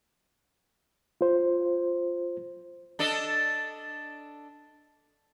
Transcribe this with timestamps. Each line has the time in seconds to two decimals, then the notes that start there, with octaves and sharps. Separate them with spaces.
1.21 F4 C5
2.99 D4 A4 D#5